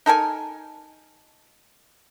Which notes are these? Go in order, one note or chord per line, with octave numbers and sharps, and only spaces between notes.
D#4 A4 A#4 G#5